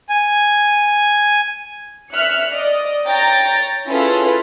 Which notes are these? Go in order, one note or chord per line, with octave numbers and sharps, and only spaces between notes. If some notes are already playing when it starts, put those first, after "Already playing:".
G#5
E5 F6 F#6 C#7
D5 D#5
C#5 G5 A#5 A6 A#6
C#4 E4 F4 G#4 A4 B4